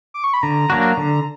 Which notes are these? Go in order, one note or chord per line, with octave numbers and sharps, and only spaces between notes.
D6
C#6
B5
D3 A#5
F#3 A#3 D4 F#4
D3